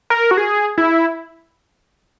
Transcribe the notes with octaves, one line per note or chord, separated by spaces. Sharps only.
A#4
F#4
G#4
E4